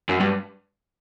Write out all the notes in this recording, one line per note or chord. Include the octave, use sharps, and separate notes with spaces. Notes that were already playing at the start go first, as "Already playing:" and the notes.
F#2
G2